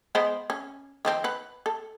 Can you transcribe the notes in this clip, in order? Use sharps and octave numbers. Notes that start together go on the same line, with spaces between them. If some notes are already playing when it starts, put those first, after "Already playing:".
G#3 B3 C5
C#4
D#3 F3 C4
B4 F#5
A4